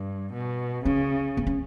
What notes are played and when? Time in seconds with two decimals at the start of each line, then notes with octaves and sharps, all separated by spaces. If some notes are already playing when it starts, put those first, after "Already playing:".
Already playing: G2
0.33 B2
0.85 C#3 C#4
1.37 B3
1.47 C#4